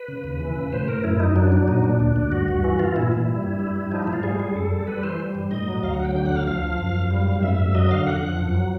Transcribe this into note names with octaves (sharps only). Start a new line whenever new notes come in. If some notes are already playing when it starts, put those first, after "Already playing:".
Already playing: B4
C#3
D#2
E3
C#3
A2 C5
A2 A#4
F#2 E4
F#2 D#4
F#3 D4
F#3 D4
A#2 D#4
A#2 D4
D2 D4
D2
G2 F#4
G2
E3 F#4
E3 F4
A#2 E4
A#2 E4
G3
G2
G3
G3
F3 D#4
E4
G#2
F4
G3 G#4
G3 G#4
F#2 A4
G3
G3 B4
E3 C5
G3
G2
A2 D#5
F#3
D2 F5
F#5
F#3
G5
D3 G5
D2 F#5
F5
F3 F5
F3
F#2
F#2
G3
G#2
F#2 E5
F#2
F#3 D#5
D3 F5
F2 F#5
F3
F#2
F#3